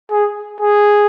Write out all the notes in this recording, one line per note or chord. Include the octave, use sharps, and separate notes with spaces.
G#4
G#4